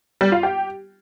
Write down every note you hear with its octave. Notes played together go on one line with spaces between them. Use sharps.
G3
F4
G4